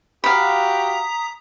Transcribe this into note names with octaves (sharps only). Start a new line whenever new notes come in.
F#4 G4 F5 A#5 B5 D#6 B6